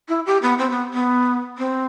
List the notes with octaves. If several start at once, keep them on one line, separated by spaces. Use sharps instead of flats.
E4
G4
B3
C4
B3
B3
C4